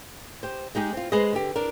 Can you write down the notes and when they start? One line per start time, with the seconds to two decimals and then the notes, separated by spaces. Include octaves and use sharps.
0.43 G4 C5
0.75 G#3 D#4 G4 G#4
0.93 C4 F4
1.12 G#3 G#4 B4 C5 D#5
1.33 D3 G4
1.56 D4 A#4